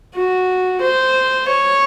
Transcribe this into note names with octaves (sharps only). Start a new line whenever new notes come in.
F#4
C5
C#5